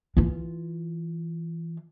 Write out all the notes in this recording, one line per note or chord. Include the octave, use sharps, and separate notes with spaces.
E3 F4